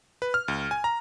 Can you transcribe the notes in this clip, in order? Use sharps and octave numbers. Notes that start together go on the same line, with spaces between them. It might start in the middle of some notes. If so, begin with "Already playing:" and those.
B4
F6
C#2
G#5
A#5